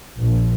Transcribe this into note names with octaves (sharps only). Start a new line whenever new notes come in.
A#1